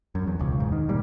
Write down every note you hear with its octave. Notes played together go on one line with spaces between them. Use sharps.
F#2
E2
E1 C#2
G#2
D#3
A#2 G3